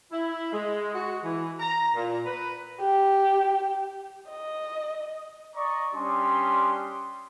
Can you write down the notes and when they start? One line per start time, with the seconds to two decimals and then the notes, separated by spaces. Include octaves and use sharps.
0.11 E4
0.52 G#3
0.94 F#4
1.23 E3
1.60 A#5
1.95 A#2
2.25 B4
2.81 G4
4.30 D#5
5.56 D5 D#5 A#5 C#6
5.94 G3 C#4 D4 G4 C6 D#6